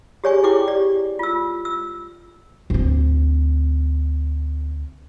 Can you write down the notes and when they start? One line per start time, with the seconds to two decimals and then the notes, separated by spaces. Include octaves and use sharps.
0.24 G4 G#4 C#5 D5 G#5 C#6
0.43 E4 G#4 G5 C#6 D6
0.68 G4 D5
1.19 F4 E6
1.65 E6
2.70 D2 C4